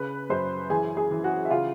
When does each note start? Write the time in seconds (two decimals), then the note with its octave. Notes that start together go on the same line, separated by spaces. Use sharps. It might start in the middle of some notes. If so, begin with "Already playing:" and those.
Already playing: C#3 B4 B5
0.30 F#2 C5 C6
0.70 E3 G#4 G#5
0.97 G#4 G#5
1.11 E3
1.24 F#4 F#5
1.45 E5
1.50 C#3 F4 F5